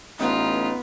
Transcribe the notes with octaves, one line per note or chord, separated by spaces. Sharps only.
A1 B3 D#4 F4